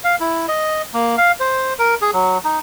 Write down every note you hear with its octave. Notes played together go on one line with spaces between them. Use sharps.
F5
E4
D#5
A#3
F5
C5
A#4
G#4
F#3
D#4